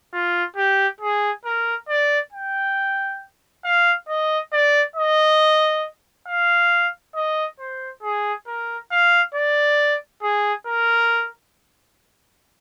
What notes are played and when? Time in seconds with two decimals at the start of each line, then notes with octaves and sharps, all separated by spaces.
0.14 F4
0.57 G4
1.01 G#4
1.45 A#4
1.89 D5
2.33 G5
3.64 F5
4.09 D#5
4.53 D5
4.96 D#5
6.27 F5
7.16 D#5
7.59 C5
8.03 G#4
8.47 A#4
8.91 F5
9.35 D5
10.23 G#4
10.67 A#4